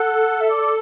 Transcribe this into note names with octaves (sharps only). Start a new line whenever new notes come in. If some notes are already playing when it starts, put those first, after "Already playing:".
Already playing: A4 F#5
E5
D5
D5